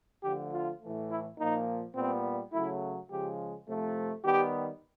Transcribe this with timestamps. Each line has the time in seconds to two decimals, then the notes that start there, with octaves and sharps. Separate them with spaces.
0.23 D3 F3 A3 G4
0.53 F4
0.81 A2 E3 A3
1.09 E4
1.38 A#2 F3 A#3 D#4
1.95 A#2 G3 B3 C4
2.52 C#3 F#3 A3 E4
3.10 C#3 F3 G#3 G4
3.67 C3 F3 A3
4.24 D#3 G3 B3 G4